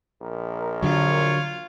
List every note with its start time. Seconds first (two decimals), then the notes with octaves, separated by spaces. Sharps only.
0.22 A#1 A#4
0.82 D3 F#3 F4 C#5